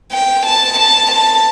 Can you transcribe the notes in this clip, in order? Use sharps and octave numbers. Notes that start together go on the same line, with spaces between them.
G5
A5
A5
A5